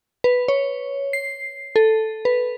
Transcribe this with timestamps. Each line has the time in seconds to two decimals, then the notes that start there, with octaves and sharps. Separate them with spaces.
0.24 B4
0.48 C#5
1.13 C7
1.76 A4
2.25 B4